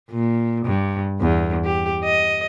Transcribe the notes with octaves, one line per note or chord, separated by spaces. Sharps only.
A#2
G2
E2
G4
D#5